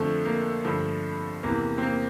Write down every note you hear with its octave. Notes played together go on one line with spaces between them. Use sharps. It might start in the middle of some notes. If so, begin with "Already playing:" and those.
Already playing: F2 D3 F3 A3
A#3
G2 D3 F3 A3
E2 C3 E3 A#3
C4
A#3